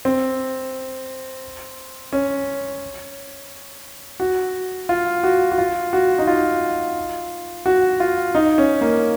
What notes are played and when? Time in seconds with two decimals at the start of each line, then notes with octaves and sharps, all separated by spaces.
0.05 C4
2.13 C#4
4.20 F#4
4.89 F4
5.24 F#4
5.52 F#4
5.58 F4
5.93 F#4
6.19 D#4
6.27 F4
7.66 F#4
8.00 F4
8.35 D#4
8.58 C#4
8.81 A#3